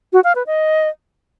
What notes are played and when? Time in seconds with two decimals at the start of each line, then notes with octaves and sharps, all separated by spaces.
0.13 F#4
0.24 F5
0.35 B4
0.47 D#5